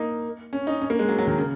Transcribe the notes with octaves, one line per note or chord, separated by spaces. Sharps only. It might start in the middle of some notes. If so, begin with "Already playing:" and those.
Already playing: A#3 D#4
C#4
D#4
C#4
A#3
G#3
F#3
F#3
D#3
C#3